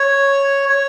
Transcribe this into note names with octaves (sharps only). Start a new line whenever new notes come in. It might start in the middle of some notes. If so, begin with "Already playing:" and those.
Already playing: C#5
C#5